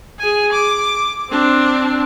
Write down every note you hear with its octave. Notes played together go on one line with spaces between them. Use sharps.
G#4 G#5
D6
C4 D4